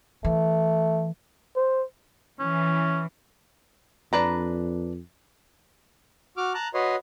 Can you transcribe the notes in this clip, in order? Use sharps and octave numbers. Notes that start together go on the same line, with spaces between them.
E3 A3
C5
E3 C#4
F2 D4 B4 A#5
F#4 D6 F6
A5 A#5 F#6
F#4 B4 C#5 D#5 C6